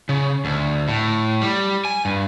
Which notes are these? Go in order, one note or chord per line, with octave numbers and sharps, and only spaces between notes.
C#3
D2
A2
G3
G#5
G2